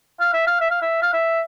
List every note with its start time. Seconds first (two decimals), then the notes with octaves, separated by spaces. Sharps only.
0.20 F5
0.33 E5
0.47 F5
0.61 E5
0.71 F5
0.82 E5
1.02 F5
1.13 E5